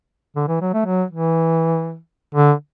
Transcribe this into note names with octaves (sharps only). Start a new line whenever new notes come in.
D3
E3
F#3
A3
F#3
E3
D3